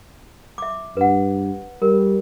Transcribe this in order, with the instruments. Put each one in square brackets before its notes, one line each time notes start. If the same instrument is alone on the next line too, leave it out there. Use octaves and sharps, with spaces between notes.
[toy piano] E5 D6
[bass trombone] G2 [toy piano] B4 F#5
[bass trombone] G3 [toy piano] A#4